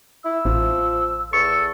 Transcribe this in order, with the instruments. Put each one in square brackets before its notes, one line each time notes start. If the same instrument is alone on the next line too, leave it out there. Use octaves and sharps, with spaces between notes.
[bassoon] E4 [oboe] E6
[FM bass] A1 [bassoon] F3
[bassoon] E2 [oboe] A4 [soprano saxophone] C#6